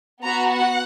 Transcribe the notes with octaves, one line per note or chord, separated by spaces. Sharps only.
B3 F#4 A#5
F#5